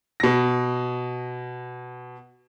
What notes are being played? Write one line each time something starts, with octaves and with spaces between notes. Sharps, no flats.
B2 A#6